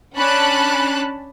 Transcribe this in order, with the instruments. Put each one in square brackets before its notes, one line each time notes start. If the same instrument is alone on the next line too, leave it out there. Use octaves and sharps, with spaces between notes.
[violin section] C#4 D4 A5 B5 F#6